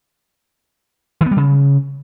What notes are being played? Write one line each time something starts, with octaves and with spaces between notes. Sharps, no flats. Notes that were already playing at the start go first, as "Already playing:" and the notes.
D#3
B3
G3
C#3